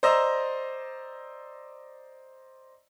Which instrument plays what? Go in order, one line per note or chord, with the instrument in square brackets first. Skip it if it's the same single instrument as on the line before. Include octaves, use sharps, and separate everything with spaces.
[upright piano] C5 D5 D#5 A#5 E6 A#6